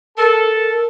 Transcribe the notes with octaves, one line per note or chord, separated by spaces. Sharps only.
A4 A#4